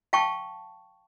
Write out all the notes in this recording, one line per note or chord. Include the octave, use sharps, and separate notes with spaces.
F5 G5 A5 C#6